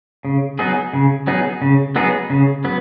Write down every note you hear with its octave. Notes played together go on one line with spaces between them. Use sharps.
C#3
F#3 B3 D#4 G#4
C#3
F#3 B3 D#4 G#4
C#3
F#3 B3 D#4 G#4
C#3
F#3 B3